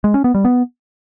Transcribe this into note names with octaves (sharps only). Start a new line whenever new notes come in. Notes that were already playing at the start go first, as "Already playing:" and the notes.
G#3
C#4
B3
G3
B3